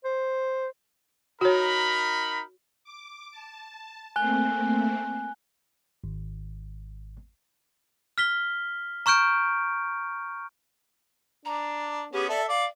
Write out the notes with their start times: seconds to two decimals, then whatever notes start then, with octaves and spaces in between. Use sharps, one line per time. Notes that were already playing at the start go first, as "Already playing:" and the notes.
0.05 C5
1.41 D#4 F#4 A#4 C#5 B5
2.84 D6
3.32 A5
4.16 A3 A#3 C4 G#5 F#6 G7
6.04 G#1
8.18 F6 B6 G7
9.06 A#5 C#6 F6 G6 D7
11.45 D4 A#5
12.13 B3 C#4 G4 G#4
12.29 A4 D5 E5
12.49 D5 F5